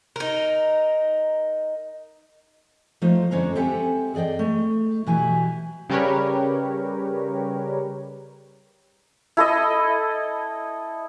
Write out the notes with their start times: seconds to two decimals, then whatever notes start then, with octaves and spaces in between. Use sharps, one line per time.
0.16 D#4 A#4
3.02 F3 A3 D#4 F4
3.31 F2 D3 C#4 D4 C5 A#5
3.55 C4 G4 A4 E5 F#5 G#5
4.14 E2 G#4 D5 D#5 G5
4.39 A3
5.06 B2 E3 F#3 E4 G4 G#5
5.89 C#3 G3 G4 A#4 B4 C#5
9.37 E4 A4 D#5